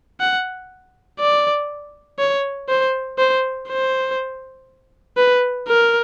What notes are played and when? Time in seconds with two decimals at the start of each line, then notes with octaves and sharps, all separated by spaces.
0.20 F#5
1.19 D5
2.19 C#5
2.69 C5
3.18 C5
3.69 C5
5.17 B4
5.68 A#4